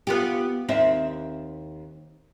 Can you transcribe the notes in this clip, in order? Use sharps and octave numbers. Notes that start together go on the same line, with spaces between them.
B3 F4 G4
D#2 C4 E5